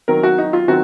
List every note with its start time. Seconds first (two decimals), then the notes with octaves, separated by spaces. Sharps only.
0.08 D#3 F#3 C4 A#4
0.23 F#4
0.38 D#4
0.53 F4
0.68 D#3 F#3 C4 F#4